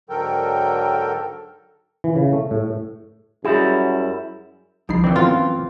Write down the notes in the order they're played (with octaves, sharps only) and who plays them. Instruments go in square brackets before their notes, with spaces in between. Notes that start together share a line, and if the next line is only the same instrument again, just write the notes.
[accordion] G#2 D3 F#3 A4 A#4 G5
[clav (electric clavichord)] E3
C#3
A3
A2
[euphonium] F#2 [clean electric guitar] G3 E4 F#4 [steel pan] G#4
[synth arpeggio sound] C#2 D#4 C7 [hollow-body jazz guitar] F3 B5
[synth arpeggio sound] D#3 D5 [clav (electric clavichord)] E3 C4
[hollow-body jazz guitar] F#2 F5 [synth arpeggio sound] F#3 A3 B3 [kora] F4